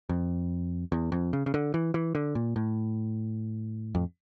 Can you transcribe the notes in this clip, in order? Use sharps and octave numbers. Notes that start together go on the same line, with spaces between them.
F2
E2
F2
C#3
C#3
D3
E3
E3
D3
A#2
A2
F2